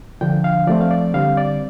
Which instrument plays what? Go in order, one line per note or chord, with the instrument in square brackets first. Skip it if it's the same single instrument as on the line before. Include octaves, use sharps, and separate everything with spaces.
[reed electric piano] D3 F3 D4 G5
F5
F3 A3 C4 D5
F5
D5
D3 G3 C4 F5
D5